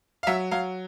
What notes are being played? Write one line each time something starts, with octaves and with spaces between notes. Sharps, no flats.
F5
F#3 E5
F#3 F5